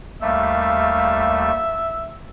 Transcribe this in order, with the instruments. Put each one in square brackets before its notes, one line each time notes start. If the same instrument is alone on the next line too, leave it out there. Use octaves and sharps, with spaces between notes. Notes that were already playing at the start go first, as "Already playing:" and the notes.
[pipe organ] D#2 G3 A3 [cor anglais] E5 [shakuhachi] F5